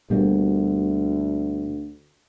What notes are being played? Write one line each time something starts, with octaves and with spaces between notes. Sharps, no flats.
D2 B2 G3 A#3